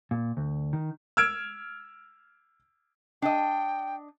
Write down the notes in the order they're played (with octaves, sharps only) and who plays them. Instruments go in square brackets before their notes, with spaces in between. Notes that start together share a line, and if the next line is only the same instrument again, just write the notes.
[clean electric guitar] A#2
D2
D#3
[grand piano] E6 F6 G#6 D7
[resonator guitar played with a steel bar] D4 D#5 [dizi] G5